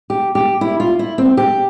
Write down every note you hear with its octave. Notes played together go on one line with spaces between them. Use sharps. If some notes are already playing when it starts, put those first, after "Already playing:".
G4
G4
E4
F4
E4
C4
G4